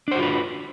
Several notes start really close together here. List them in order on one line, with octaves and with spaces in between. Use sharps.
D4 C5 F#4 F4 B4